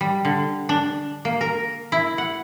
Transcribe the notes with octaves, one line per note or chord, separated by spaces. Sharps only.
G3
D3
D4
A#3
A#4
E4
F#5